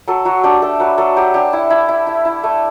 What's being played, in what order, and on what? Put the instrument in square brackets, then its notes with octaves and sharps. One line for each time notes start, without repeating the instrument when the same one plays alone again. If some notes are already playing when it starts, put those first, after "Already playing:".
[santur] F#3 A4
F#3 F#4
D4 G4
A3 A4
F#3 B4
F#3 A4
F#3 G4
D4 G4
E4
E4
E4
E4
E4
A3